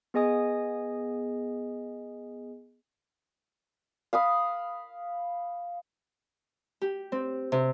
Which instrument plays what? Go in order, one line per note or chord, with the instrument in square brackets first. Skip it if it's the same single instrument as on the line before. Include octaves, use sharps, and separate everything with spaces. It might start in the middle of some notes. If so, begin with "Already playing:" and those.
[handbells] B3 G#4 D#5 G#5 D#6
[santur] F5 B5 D#6
[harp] G4
C4
C3